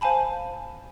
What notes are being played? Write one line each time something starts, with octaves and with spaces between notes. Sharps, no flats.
C5 F5 G#5 A5 B5